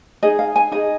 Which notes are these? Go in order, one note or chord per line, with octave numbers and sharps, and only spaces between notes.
D#4 G#4 D#5
F5
G#5
D#4 G#4 D#5